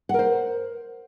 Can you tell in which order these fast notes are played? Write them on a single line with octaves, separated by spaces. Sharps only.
F#5 A#4 C5